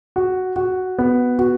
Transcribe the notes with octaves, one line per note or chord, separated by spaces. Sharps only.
F#4
F#4
B3
F#4